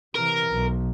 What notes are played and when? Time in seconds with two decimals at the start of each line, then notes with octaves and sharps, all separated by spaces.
0.15 C3 E3 A#4
0.49 B1